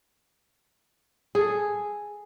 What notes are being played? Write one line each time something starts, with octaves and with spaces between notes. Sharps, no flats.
G#4 A4